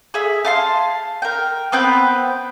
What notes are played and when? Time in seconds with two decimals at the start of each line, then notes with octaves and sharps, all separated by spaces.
0.14 G#4 E5
0.45 F5 A5 C6
1.22 A#4 G5
1.72 B3 C4 B4 G5